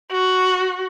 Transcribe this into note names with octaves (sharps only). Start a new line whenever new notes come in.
F#4